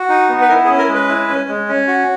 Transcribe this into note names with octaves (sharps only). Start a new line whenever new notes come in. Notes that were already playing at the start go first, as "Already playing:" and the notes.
Already playing: F#4
D#4
B3
B4
E4 A#4
G#4
C#4
A#4
G#3
B4
E4
C#4
G#3
C#4
F#4